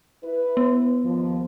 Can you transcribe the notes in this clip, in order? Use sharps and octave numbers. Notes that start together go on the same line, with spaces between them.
E4 B4
B3
D#2 F3